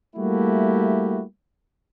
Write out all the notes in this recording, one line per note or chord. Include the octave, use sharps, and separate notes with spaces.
G3 A3 A#3 E4 F#4 G4